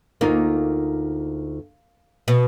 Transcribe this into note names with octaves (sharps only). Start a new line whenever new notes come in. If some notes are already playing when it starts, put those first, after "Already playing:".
D2 A#3 D#4 F4
B2